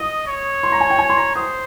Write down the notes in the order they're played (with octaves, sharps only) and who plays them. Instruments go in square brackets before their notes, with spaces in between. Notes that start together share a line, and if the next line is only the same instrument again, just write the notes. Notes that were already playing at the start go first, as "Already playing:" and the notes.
Already playing: [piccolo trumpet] D#5 [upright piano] D#6
[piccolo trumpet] C#5
[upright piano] C6
A#5
G#5
G5
G#5
C6
A#5
[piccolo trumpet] C5 [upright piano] D#6